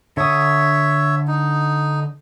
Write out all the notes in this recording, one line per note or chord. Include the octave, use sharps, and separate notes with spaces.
D3 C#5 E5 D#6
D#4